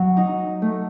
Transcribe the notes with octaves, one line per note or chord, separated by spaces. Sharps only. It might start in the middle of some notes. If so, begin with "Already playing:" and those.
Already playing: F#3
D#4
A3